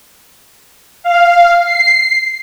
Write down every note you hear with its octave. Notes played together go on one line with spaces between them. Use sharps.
F5
C7